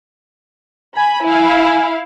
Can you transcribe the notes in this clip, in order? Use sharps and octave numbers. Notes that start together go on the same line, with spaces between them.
G#5 B5
E4 F5